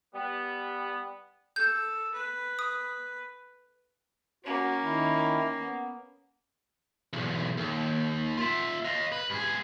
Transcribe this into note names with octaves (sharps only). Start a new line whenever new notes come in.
G3 B3
A4 G6
B4
D#6
A#3 C#4 F#4
D#3 E4
B3
B1 E2
D#2
F4 E5
D#5 F5
B4
G2 G#4